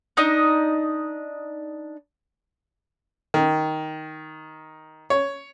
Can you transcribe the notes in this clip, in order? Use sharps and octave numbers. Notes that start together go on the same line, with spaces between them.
D4 D#4 D#5
D#3
C#5